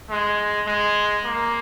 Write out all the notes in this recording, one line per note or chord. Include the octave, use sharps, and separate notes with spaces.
G#3
G#3
A#3